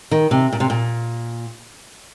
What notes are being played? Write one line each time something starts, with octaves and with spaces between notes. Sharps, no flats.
D#3
C3
A#2
C3
A#2